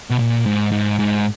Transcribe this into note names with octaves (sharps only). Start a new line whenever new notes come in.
B2
A#2
G#2
G#2
G#2